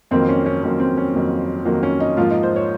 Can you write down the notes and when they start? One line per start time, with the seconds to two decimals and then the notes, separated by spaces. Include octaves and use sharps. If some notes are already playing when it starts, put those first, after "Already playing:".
0.11 F2 D#3 F#3 A#3 C4
0.29 C#4
0.46 C#4
0.63 F2 D#3 F#3 A#3 C#4
0.80 C4
0.97 C#4
1.14 F2 D#3 F#3 A#3
1.65 F2 D#3 F#3 A#3
1.83 C#4
2.00 D#4
2.17 G#2 F3 A#3 F4
2.30 D#4
2.43 C5
2.56 C#5